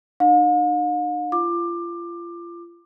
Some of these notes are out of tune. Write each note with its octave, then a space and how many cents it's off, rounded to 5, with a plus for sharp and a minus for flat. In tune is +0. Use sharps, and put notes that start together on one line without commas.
D#4 -45 F5 +45
F4 -30 D6 +20